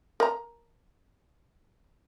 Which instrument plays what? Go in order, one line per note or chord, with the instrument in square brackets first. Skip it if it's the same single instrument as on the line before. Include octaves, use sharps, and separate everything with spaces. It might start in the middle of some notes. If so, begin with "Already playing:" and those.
[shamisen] A#4 A#5